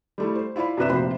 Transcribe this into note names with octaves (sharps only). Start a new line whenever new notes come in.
G3 A3 E4
C5
E4 F4 D5 F5 B5
F#2 C3 D4 B4 E5 E7
F1 A#1 C3 C5 B5